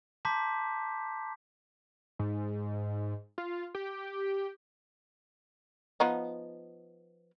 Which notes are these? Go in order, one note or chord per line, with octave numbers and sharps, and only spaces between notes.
A5 A#5 C6 D6 G6 B6
G#2
F4
G4
F3 B3 D#4